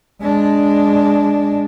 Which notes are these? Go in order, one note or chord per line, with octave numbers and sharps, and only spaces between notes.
G#3 D4